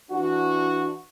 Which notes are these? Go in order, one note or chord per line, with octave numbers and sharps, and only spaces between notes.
E3 D4 F#4